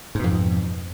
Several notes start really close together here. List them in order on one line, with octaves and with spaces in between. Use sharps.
G#2 B2 F2